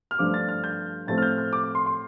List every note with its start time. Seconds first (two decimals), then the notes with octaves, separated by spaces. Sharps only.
0.11 F6
0.19 G2 F3 A3 D4 D6
0.34 A6
0.49 F6
0.64 G6
1.07 A2 F3 A3 C4 A6
1.18 F6
1.22 G6
1.38 F6
1.53 D6
1.64 D6
1.75 C6
1.86 C6